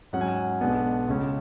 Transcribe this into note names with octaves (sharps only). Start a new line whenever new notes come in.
G#2 F#3 C#4 F#5
G#5
F#5
B1 B2 G#3 B3 D4
C#2 C#3 G#3 C#4